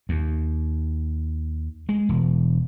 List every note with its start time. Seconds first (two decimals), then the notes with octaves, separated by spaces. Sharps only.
0.09 D#2
1.89 G#3
2.09 E1